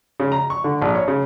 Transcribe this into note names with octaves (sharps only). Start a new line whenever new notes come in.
C#3
A#5
C#6
D3
A#1
C#5
C#3